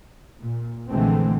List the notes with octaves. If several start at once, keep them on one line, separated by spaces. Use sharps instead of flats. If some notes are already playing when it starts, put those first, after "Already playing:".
A#2
A#1 D3 E3 G#3 A3 C4